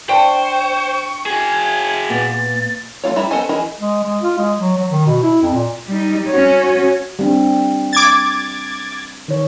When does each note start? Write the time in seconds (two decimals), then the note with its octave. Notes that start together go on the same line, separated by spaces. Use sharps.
0.09 D4 C5 G5 C#6
1.26 F#4 G#4 G#6
2.10 A#2 B3 A6
3.03 A3 E4 F4 C#5
3.16 G3 E4 E5 A#5
3.31 B3 A4 C5 D#5 G#5
3.49 E3 E4 G#4 A#4 D#5
3.80 G#3
4.03 G#3
4.22 F4
4.38 G#3
4.58 F#3
4.78 F#3
4.90 D#3
5.06 B2
5.23 E4
5.42 F2
5.54 A#2
5.87 G3 D#4
6.30 C#4 F#4 C#5
7.19 G3 C4 D4
7.93 D6 G#6 A6
9.28 D#3 C#5